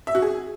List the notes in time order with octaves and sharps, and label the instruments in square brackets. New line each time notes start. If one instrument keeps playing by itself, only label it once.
[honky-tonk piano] E5
F#4
G#4